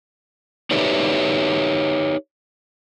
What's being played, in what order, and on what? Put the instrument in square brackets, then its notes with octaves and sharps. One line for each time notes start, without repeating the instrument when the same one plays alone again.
[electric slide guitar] D#4 G4 B4 C#5 D5 E5